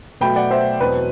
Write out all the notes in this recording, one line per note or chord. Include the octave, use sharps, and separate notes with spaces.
B2 F#3 A3 G5 B5
D5 F#5
C5 E5
E2 B2 F#3 C4 B4